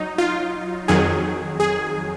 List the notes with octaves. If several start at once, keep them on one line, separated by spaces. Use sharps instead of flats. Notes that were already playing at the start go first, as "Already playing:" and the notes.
Already playing: F#3 D#4
F4
F2 D#3 F#3 G#4
G#4